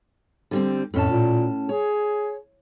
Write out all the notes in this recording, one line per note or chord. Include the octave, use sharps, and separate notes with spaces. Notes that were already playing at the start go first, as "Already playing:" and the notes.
D3 G3 C4
F2 A2 C#4 A5
A#2
G#4 C#5